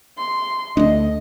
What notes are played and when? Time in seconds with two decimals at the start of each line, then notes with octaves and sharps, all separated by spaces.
0.18 C6
0.77 D2 A3 D4 D#5